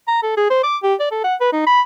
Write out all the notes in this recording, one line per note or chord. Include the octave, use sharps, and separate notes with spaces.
A#5
A4
G#4
C5
D6
G4
D5
A4
F#5
B4
D#4
B5